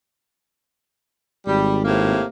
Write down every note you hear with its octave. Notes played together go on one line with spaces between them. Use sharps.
G#1 G3
A2 C3 A#3